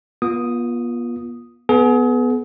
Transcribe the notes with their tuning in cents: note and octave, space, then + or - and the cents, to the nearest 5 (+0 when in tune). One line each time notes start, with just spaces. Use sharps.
B3 -40 F4 +0 D#6 +0
B3 +0 G#4 +35